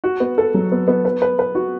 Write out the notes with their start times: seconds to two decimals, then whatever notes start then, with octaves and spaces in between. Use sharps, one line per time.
0.04 F#4
0.20 B3
0.38 A4
0.54 F#3
0.72 B3
0.88 B3
1.05 B4
1.22 B4
1.39 B4
1.55 F#4